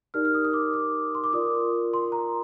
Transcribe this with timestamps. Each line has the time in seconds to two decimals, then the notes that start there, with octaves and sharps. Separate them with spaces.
0.14 D#4 G4 A#4 D5 F6
0.25 F6
0.34 D#6
0.45 D#6
0.53 D6
0.74 D#6
1.15 C6
1.24 D6
1.33 F4 A#4 D5 D#6
1.94 C6
2.12 A#5